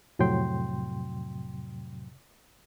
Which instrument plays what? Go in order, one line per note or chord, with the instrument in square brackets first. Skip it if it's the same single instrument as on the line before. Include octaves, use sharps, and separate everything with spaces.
[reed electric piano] F2 A2 C3 F#3 G5 C6